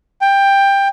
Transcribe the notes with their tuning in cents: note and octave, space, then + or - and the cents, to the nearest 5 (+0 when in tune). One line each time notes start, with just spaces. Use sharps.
G5 +15